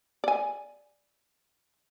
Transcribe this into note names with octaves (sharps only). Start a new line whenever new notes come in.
D5 G#5